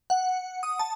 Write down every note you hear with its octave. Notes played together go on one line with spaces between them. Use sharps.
F#5
D#6
A5